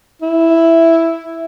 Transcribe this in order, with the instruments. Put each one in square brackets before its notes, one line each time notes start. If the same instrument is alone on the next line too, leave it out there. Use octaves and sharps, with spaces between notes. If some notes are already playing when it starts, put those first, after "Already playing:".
[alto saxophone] E4